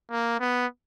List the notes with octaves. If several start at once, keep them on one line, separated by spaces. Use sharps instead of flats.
A#3
B3